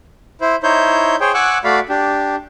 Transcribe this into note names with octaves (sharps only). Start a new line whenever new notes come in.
E4 C5
D#4 E4 C5 C#5 G6
G#4 C5 C#5 G5
F#5 G#5 C#6 D6 E6 F#6
A3 F#4 D5 F5 B5
D4 G4